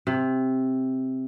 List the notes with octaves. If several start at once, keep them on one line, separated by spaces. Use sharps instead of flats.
C3